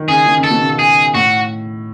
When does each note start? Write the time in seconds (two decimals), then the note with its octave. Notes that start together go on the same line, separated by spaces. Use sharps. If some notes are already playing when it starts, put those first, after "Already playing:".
Already playing: D#3
0.09 C#3 G#4
0.26 D#3
0.38 C#3
0.44 A4
0.51 B2
0.62 C#3
0.79 G#4
1.14 A2 F#4